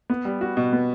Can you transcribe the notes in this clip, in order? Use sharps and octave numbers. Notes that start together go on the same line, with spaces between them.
B3
G3
F#4
B2
B3